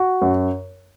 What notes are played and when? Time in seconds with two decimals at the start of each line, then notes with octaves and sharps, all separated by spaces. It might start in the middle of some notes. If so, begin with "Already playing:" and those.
Already playing: F#4
0.22 F#2